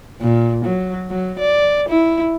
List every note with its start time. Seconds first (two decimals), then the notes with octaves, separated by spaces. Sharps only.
0.21 A#2
0.65 F#3
1.10 F#3
1.39 D5
1.89 E4